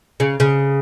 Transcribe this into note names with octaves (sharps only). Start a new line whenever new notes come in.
C#3
C#3